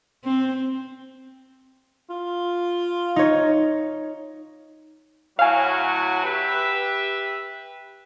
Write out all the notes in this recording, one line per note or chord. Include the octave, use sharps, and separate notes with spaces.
C4
F4
D#4 C#5
A2 F#3 F#4 F5 G#5
G4 B4 E5